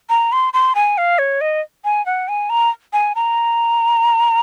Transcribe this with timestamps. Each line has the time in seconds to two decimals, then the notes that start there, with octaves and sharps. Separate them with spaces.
0.10 A#5
0.32 C6
0.53 C6
0.75 G#5
0.98 F5
1.19 C#5
1.41 D#5
1.85 G#5
2.06 F#5
2.28 G#5
2.50 A#5
2.93 G#5
3.15 A#5